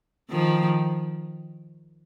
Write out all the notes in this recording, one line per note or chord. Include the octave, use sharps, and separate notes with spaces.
D#3 F3